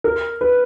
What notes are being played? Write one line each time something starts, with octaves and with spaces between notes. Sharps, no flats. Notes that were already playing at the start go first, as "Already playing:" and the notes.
A#4
B4